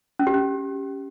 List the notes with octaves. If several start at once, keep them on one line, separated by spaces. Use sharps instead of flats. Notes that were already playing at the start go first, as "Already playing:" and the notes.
C#4
G4
C#4